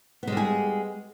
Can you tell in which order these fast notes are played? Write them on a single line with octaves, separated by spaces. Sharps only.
B3 G#3 G3 G#4